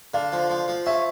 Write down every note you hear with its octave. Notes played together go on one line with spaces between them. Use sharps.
D3 F5
F3
F3
F3
C#4 E5